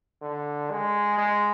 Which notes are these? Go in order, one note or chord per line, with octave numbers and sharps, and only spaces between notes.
D3
G#3
G#3